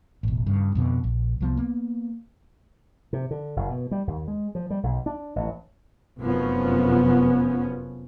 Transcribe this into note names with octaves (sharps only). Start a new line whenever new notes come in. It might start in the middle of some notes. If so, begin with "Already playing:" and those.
E1 A1
G2 C#3
F2 B2 D3
A#1
C2 F3 B3
A#3 B3
C3
D3
F#1
B2
G3
D#2
G#3
F3
G3
B1
D4
A1
F1 F#2 F3 B3 C#4